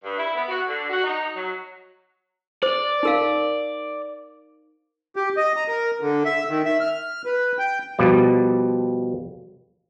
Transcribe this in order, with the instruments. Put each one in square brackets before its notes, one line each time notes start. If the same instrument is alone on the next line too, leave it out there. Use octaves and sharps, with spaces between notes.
[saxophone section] G2
E4
B3
F#4
D3
F#4
D#4
F#3
[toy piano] C5 [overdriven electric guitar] D5
[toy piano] D#4 A#4 F5
[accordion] G4
D#5
A#5
A#4
D3
E5
D#3
E5
F6
B4
G5
[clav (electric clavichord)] B2 F3 G3 D5